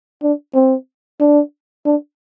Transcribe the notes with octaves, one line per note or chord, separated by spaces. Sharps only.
D4
C4
D4
D4